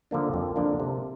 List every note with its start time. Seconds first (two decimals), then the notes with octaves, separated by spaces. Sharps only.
0.11 D3 F3 A#3 D4
0.34 F2
0.56 D3 F3 A#3 D4
0.80 C3